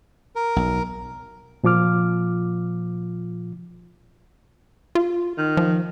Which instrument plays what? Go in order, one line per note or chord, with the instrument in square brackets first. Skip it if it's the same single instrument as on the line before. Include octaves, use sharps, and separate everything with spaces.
[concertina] A#4
[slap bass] B1
[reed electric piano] A#2 F3 F4 D6 F6
[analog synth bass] F4
[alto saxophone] D#3
[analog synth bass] F3